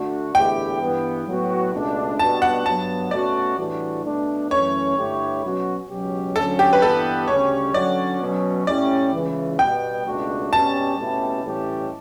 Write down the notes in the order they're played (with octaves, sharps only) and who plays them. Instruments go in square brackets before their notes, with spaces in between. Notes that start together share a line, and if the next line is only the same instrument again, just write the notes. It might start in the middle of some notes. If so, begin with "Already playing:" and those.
Already playing: [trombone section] D3 A3 D4 F#4
[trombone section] E2 D3 A3 E4 G4 [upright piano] G5
[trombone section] G2 E3 G3 B3
A2 F#3 B3 F#4
C#2 B2 A3 D4
[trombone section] B2 G3 B3 D4 F#4 [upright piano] A5
[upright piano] F#5
[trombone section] G2 F#3 B3 [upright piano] A5
[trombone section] B2 A3 C#4 F#4 [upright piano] D5
[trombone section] A2 E3 G3 D4 F#4
B2 A3 D4
[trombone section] F#2 E3 A3 C#4 [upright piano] C#5
[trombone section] G2 D3 A3 E4 G4
B2 F#3 C#4 F#4
C#2 B2 F#3 C#4 G4
[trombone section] D2 D3 F#3 C#4 [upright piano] A4
[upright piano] G4
B4
[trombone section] G2 E3 G3 B3 [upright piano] A4
[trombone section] D2 C#3 G3 C#4 G4 [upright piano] C#5
[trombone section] D3 F#3 C#4 F#4 [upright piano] D5
[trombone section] B2 F#3 C#4
[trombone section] A2 G3 C#4 E4 G4 [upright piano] D5
[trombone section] C#2 C#3 E3
[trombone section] B2 G3 B3 [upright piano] G5
[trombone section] C#2 B2 A3 D4 F#4
[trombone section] B2 G3 C#4 G4 [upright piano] A5
[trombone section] B2 A3 C#4 E4 G4
A2 E3 G3 C#4 G4